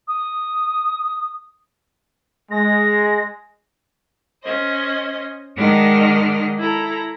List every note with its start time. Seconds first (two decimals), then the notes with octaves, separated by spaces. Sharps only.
0.08 D#6
2.51 G#3 A#6
4.44 C#4 C5 D#5
5.57 D#3 G#3 D4 D#5 F#5 F6
6.59 E4 A4 A#5